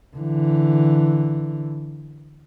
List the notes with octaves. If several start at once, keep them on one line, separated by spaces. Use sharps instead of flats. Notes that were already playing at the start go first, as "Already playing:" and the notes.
D3 E3